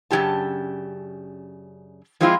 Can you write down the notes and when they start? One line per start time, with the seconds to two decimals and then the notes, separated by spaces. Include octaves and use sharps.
0.11 F#2 C#3 E3 D4 G4 A5
2.21 F3 G#3 C4 E4 F4